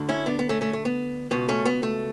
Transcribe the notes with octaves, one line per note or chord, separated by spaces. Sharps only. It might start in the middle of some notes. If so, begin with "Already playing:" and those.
Already playing: D2 D3
C#4 E4
B3 D4
B3
A3 C#4
A3 C#4
A3
B3
C#2 B2 B3
A3 C#4
B3
A3